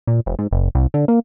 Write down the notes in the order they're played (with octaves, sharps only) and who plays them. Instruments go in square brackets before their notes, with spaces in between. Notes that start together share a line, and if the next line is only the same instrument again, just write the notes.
[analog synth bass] A#2
F1
G#2
F#1
C2
D3
A#3